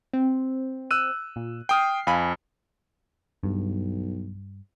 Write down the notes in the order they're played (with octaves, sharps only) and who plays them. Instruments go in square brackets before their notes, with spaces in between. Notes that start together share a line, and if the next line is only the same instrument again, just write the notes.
[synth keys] C4
[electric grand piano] E6 F#6 D#7
[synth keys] A#2
[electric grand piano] G5 D#6 F6 [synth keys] C7
[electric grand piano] F2 [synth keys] F5 G#5 B5
[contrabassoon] B1 [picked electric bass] G2